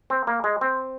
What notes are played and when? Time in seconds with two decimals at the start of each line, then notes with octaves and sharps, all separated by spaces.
0.10 C4
0.27 A#3
0.44 G#3
0.61 C4